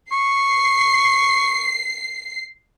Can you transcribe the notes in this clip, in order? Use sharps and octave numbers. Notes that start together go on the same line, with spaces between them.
C#6 C7